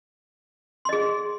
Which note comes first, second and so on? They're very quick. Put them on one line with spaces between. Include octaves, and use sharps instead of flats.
C6 D#5 G#4